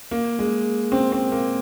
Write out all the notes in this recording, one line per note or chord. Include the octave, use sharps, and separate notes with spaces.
A#3
G#3
C4
C4
A#3